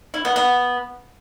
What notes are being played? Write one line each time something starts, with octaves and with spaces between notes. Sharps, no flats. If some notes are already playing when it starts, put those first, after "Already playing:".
E4
B3
B3